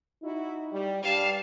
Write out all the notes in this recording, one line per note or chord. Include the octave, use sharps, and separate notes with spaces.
D#4 E4 F#4
G3
G2 G3 F5 A5